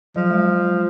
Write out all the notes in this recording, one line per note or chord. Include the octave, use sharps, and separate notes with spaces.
F3 F#3
G#3
F#3